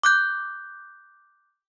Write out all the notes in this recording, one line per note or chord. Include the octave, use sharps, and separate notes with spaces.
D6 F#6 G6